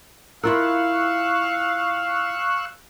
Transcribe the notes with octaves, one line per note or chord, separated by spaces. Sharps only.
E4 F4 A#4 F5 C#6 E6 F#6